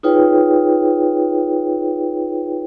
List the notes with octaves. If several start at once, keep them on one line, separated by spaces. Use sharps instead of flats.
D#4 F4 G#4 B4 C#5 G5